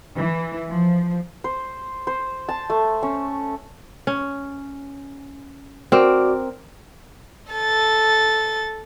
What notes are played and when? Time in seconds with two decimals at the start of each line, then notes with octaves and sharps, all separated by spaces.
0.17 E3
0.70 F3
1.44 C5
2.07 C5
2.49 A5
2.70 A3
3.03 C#4
4.07 C#4
5.92 C4 F#4 A#4 D5 D6
7.53 A4 A6